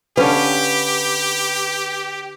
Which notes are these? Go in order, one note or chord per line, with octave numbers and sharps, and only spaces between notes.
D3 C#4 G4 B4 F5